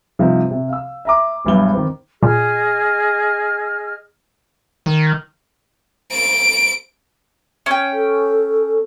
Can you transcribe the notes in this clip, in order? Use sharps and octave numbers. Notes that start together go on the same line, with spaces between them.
G2 C3 F3 D#4
C3
F5 E6
E5 A#5 D6
E1 E2 G2 F#3 G7
D#3 C4
A#2 G#4 D#5 F6
D#3
D7
C#4 G5
A4